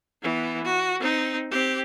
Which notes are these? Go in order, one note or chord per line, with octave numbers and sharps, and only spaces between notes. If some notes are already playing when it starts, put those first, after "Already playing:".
E3 B3
F#4
C4 D#4
C4 G4